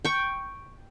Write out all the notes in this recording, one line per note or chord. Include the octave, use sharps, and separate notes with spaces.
G5 C#6